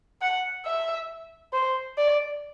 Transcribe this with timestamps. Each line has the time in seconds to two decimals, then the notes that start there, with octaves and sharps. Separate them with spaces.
0.21 F#5
0.65 E5
1.53 C5
1.97 D5